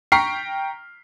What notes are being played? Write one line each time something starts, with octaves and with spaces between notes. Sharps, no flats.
G5 A#5 C#6 F6 B6 C7